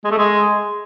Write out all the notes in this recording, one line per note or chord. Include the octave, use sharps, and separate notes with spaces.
G#3
A3
G#3